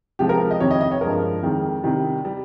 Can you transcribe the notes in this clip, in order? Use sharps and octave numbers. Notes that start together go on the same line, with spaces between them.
C3 F3 G#3 G4
A#4
D#5
F2 C3 D#3 C#5
D#5
D#5
C#5
G2 F3 G#3 A#4
F2 D#3 G#3
C3 D#3 G3
G3